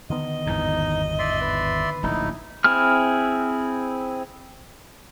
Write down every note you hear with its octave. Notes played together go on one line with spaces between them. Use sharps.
D3 D#3 B3 D#5
G#1 E2 G2 D#4
D5 E5 C6
B4
D1 A#1 D#4 E4
C4 E4 G#4 F6